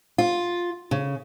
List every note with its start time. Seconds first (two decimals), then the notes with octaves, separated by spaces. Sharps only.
0.18 F4
0.91 C#3